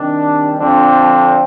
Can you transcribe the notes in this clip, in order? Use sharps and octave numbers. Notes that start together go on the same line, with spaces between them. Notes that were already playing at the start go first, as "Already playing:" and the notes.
Already playing: C3 D#3 G3 D4
F2 D3 F3 C4 D4